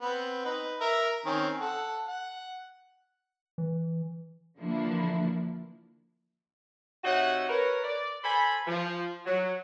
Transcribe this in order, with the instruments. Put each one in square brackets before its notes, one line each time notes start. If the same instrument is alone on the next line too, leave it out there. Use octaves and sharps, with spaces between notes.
[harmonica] B3 C4
D#4 B4
A#4 E5
D#3 C4 C#4
A4 F#5
F#5
[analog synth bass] E3
[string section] D3 E3 F3 A#3 D4 E4
[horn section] C3 D#4 F#4 C#5 E5 F#5
A#4 B4 C#5
D5
A4 C5 G#5 B5
F3
F#3